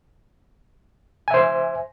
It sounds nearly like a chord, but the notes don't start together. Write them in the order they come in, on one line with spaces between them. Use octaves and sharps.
G#5 E5 C5